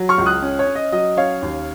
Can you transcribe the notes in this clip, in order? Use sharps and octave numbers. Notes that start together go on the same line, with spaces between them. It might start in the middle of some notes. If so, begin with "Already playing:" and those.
Already playing: F#3
C#6 F6
C#2
D#6 F#6
C#4
C#5
C#4
D#5
F#3 D#5
C#4 C#5 F5
D#2